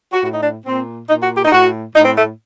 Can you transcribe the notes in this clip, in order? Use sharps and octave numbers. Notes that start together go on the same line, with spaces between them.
F#4
A2 F#4
D#4
D4
A#2 C4
A#2 D#4
F#4
G4
D#4
A2 F#4
A2 D#4
C4
A3